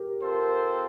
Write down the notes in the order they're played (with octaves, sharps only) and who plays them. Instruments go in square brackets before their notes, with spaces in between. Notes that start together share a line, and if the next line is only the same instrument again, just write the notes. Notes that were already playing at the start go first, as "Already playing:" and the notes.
Already playing: [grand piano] G4 A#4
[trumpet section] C4 F4 A4 C5